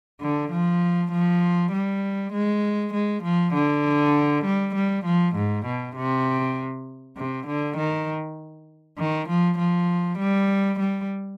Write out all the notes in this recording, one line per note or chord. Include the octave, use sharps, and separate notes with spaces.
D3
F3
F3
G3
G#3
G#3
F3
D3
G3
G3
F3
G#2
B2
C3
C3
D3
D#3
D#3
F3
F3
G3
G3